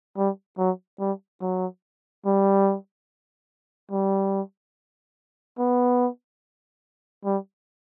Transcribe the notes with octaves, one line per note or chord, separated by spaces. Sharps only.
G3
F#3
G3
F#3
G3
G3
B3
G3